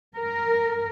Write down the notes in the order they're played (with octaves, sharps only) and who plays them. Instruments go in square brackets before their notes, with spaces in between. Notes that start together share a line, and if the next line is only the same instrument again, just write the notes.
[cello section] A#4